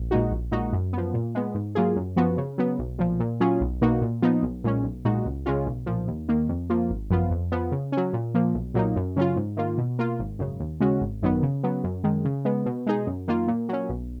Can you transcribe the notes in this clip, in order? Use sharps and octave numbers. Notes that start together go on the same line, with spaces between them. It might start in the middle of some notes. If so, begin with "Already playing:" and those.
Already playing: A#1
A#2 G#3 D#4 F#4
A#1
A#2 G#3 D#4 F#4
F#2
F3 B3
A#2
G#3 B3
G#2
F#3 A#3 F4 G#4
F#2
F3 B3 F#4
C#3
F#3 B3
B1
A#2 F3
A#2
F#3 C#4 F4 G#4
B1
B2 A#3 D#4 F#4
A#2
F3 B3 D#4
B1
A#2 G#3 C#4
B1
A#2 G#3 D#4 F#4
C#2
C#3 G#3 C#4 F4
B1
A#2 F3
D#2
D#3 A#3
F2
F3 A#3 F4
G#1
F#2 F3 B3 F4
F2
F3 B3
C#3
F#3 C#4
A#2
F3 A#3
B1
A#2 F#3 A#3 D#4
F#2
C#3 F#3 C#4 F4
G#2
D#3 A#3 F4
B2
A#3 F4
G#1
F#2 C#3
D#2
C#3 G#3 C#4 F#4
G#1
F#2 D#3 F#3 B3
C#3
F#3 B3
F#2
D#3 G#3
C#3
G#3 B3
B2
G#3 D#4 G#4
F#2
D#3 A#3 F4
A#2
F#3 C#4
B1